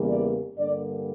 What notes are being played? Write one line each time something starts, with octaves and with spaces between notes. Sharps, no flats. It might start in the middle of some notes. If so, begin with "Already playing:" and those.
Already playing: E2 C#3 E3 G3 A#3
D5
G2 D3 G3 A#3 D5